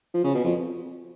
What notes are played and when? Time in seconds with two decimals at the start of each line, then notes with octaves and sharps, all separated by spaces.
0.14 F3
0.24 C#3
0.34 B2
0.44 F2